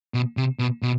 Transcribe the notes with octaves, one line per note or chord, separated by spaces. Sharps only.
B2
C3
B2
B2